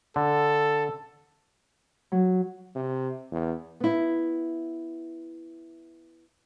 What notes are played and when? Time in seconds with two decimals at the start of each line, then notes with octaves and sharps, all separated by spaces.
0.16 D3 A4
2.12 F#3
2.75 C3
3.32 E2
3.80 B3 E4